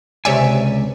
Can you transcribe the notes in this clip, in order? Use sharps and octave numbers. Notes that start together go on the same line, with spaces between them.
C#2 C3 C#5 D5 E5 G#5